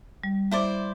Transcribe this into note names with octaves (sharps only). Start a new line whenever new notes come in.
G3
E4 C5 D5